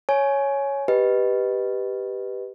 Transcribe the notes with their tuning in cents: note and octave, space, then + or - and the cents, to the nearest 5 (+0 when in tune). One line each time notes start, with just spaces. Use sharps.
C#5 +0 G#5 +15
G4 +0 B4 +0 D#5 +0